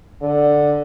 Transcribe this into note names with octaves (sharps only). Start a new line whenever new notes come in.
D3